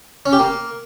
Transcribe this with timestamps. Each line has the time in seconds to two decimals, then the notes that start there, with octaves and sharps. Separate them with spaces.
0.26 C#4
0.33 G4
0.39 A#3